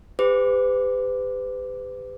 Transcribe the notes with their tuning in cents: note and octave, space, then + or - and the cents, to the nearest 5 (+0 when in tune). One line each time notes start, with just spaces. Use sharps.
G4 +40 B4 +40 D6 +0